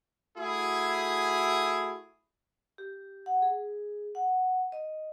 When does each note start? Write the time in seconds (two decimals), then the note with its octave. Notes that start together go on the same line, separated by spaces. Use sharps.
0.38 A3 E4 F#4 G#4
2.78 G4
3.26 F#5
3.42 G#4
4.15 F#5
4.72 D#5